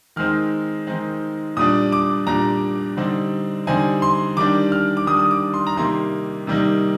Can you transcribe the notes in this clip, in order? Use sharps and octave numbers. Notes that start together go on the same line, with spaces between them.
D#3 G#3 C4 D#4 F6
D#3 G#3 C4 D#4
A#2 G3 D4 D#6
D6
A#2 G3 D4 A#5
D3 G3 C4 D#4
D3 G3 C4 D#4 G#5
C6
D#3 G3 D4 D6
F6
D6
D#3 G3 D4 D#6
D#6
D6
C6
A#5
C3 D#3 G3 A#3 D#4 C6
C3 D#3 G3 A#3 D#4